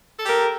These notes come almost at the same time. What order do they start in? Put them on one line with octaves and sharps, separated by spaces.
A4 G4 A#4